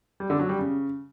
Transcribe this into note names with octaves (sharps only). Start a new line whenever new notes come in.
G3
D3
F#3
G3
C#3